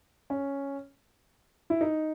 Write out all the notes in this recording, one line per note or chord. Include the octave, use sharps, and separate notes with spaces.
C#4
E4
D#4